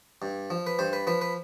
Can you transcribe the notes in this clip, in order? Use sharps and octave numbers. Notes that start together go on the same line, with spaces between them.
G2
F3
B4
G2 C5
B4
F3 B4
B4